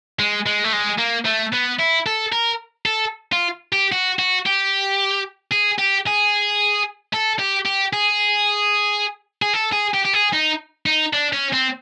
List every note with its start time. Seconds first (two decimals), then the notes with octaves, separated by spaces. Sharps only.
0.19 G#3
0.46 G#3
0.64 A3
0.73 G#3
0.98 A#3
1.25 A3
1.53 B3
1.79 E4
2.06 A4
2.32 A#4
2.86 A4
3.33 F4
3.73 G4
3.92 F#4
4.19 F#4
4.46 G4
5.52 G#4
5.79 G4
6.07 G#4
7.13 A4
7.39 G4
7.66 G4
7.93 G#4
9.42 G#4
9.54 A4
9.72 G#4
9.94 G4
10.05 G4
10.13 G#4
10.33 D#4
10.86 D#4
11.13 D4
11.33 C#4
11.53 C4